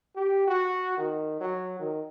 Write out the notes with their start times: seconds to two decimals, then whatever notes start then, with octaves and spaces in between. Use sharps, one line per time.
0.16 G4
0.47 F#4
0.97 D#3
1.40 F#3
1.80 D#3